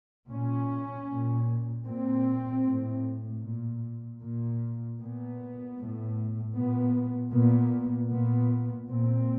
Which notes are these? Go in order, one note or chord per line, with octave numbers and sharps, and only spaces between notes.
A#2 C#4
A#2
A#2 C4
A2
A#2
A#2
A#2 B3
A2
A#2 B3
A#2 B3
A#2 B3
A#2 C4